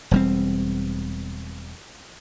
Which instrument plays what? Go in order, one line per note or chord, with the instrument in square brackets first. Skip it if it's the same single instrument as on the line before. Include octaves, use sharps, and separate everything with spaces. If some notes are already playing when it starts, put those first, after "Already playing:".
[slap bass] E1 G3 C4